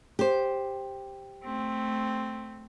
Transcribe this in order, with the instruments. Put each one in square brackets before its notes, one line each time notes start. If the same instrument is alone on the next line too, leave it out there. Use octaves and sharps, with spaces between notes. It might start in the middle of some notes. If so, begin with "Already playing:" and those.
[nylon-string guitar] G4 C5
[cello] A3 C4